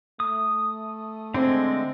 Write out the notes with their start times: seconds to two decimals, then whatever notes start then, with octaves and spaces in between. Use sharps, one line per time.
0.20 A3 D#6
1.34 D3 G#3 C4